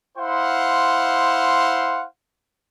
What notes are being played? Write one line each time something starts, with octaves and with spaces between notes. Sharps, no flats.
E4 C5 F5 F#5 C6